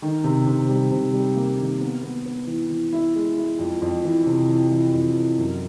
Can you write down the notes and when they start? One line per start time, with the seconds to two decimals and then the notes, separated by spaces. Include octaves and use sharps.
0.02 D#3
0.24 C3
0.47 C3
0.69 G3
0.91 C3
1.13 G3
1.36 A#3
1.58 D#3
1.81 B3
2.03 B3
2.25 B3
2.47 E3
2.70 E3
2.93 E4
3.15 G#3
3.37 E4
3.59 F2
3.82 F2
4.04 E3
4.26 C3
4.48 E3
4.71 E3
4.94 F2
5.16 E3
5.38 F#2